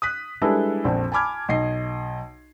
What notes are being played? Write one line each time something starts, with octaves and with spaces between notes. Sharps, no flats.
D#6 F#6 B6
G3 G#3 D4 E4 A4 B4
A#1 F2 C4
G#5 A5 B5 D6 F6 G#6
B1 D#5 C7